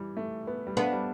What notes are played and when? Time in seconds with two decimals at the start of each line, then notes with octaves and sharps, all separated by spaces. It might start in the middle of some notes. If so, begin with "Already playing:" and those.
Already playing: E3 G3
0.17 A3
0.47 B3
0.67 G3
0.76 A3 B3 D4
0.92 G3